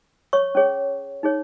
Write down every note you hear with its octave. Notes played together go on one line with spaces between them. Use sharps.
C#5 C#6
C#4 G#4 C#5
D#4 G#4 C#5